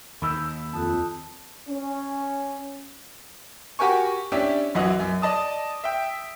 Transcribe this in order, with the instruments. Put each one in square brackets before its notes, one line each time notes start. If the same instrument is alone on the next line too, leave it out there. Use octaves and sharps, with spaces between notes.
[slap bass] D#2 D#3 [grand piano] B5 E6 G6
[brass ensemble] F2 [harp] A5 D#6 F#6
[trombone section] C#4
[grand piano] F#4 G4 A#4 G#5 C#6
C#4 D4 E4 G4
B1 F#2 E3 F#4 D#5
F#2
D5 D#5 A5 D#6
E5 G5